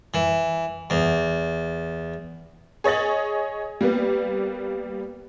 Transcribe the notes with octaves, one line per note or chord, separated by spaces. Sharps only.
E3
E2
G#4 C#5 D#5 A6 F#7
G3 A#3 B3